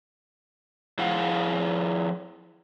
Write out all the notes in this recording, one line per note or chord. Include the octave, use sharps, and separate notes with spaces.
F3 E4 G#4 F5 F#5